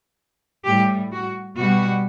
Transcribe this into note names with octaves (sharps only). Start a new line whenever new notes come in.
A2 G3 G4
F#4
B2 G3 F#4